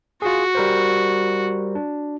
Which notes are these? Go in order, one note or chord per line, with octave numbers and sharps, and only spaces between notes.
F4 F#4 G#4
G3 A#4 C5
D4